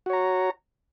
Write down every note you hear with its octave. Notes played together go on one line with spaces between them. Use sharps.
F#4 C#5 A#5